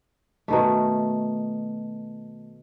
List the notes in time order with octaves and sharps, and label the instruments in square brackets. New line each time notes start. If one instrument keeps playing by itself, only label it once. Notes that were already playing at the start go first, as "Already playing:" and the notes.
[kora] B2 D#3 A3